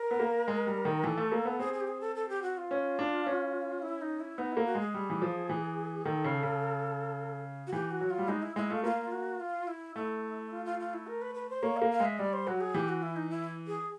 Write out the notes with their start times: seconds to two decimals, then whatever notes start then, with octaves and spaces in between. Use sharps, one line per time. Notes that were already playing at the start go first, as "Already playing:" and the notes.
Already playing: A#4
0.11 B3
0.20 A#3
0.48 G#3
0.67 G3
0.85 D#3
1.04 E3 A4
1.18 A3
1.32 A#3
1.45 B3
1.59 C4 G#4
1.73 G#4
1.81 G4
1.87 G#4
2.01 A4
2.15 A4
2.29 G4
2.42 F#4
2.57 F4
2.71 C#4
2.99 D4
3.26 C#4
3.82 E4
4.01 D#4
4.20 E4
4.38 B3 D#4
4.52 A#3 E4
4.65 F#4
4.75 G#3
4.80 G#4
4.94 G3
5.10 E3
5.22 F3
5.49 E3
6.05 D#3 A4
6.24 C#3
6.43 C#3
7.67 F#4
7.72 E3 G4
7.91 F#4
8.01 F#3
8.11 F4
8.18 G3
8.28 G#3 D#4
8.42 E4
8.56 G#3 E4
8.70 A3 F4
8.84 A#3 F4
9.12 F#4
9.40 F4
9.68 E4
9.96 A3 E4
10.51 F4
10.65 F4
10.80 F4
10.94 E4
11.07 A#4
11.22 B4
11.35 B4
11.50 C5
11.63 A#3 C#5
11.77 A#3 F5
11.91 F5
12.00 G#3 E5
12.18 G3 D5
12.33 C5
12.47 F#3 F#4
12.61 G#4
12.74 E3 G4
12.89 F#4
13.03 E4
13.16 D#4
13.30 E4
13.67 G#4